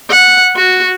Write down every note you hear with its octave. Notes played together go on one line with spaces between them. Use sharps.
F#5
F#4